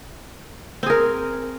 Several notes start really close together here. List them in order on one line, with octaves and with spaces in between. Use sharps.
C4 G#4 A#4